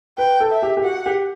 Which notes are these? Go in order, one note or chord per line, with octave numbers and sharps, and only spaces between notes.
B4 G5
A4
E5
G4
G4
F#4 F#5
G4